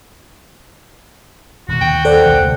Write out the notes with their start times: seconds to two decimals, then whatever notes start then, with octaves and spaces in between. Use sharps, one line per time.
1.68 D#1 C3 F#4
1.81 D#2 G5
2.05 A4 C5 D5 F#5
2.25 B1 D#3 E3
2.41 D2 C3 G#3